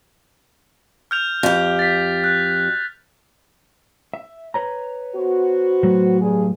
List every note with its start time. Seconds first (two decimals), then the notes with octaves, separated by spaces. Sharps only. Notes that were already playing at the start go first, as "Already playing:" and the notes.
1.11 F6 G6 F7
1.43 F2 G4
1.79 A6 B6
2.24 F#6
4.14 E5
4.54 B4 C#5 A#5
5.15 B3 F#4 C5
5.83 A2 F#3
6.20 G2 G#4